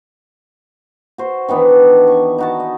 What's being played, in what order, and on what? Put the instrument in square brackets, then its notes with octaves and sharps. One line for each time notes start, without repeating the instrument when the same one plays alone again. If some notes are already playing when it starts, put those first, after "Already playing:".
[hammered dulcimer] F#4 C5
D#3 E3 B3 D4
C#6
D#4 F#4 A5
D#5